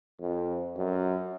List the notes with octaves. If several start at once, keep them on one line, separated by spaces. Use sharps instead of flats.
F2
F#2